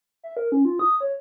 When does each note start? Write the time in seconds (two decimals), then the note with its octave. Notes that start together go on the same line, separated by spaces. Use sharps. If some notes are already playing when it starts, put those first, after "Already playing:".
0.23 E5
0.37 A#4
0.52 C#4
0.65 F4
0.79 D#6
1.01 C#5